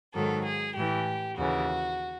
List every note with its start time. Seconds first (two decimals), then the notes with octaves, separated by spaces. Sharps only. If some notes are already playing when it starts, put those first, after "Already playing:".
0.14 G#2 D#3 F#3 A4
0.45 G#4
0.75 A2 E3 G4
1.37 D#2 C#3 E3 F#4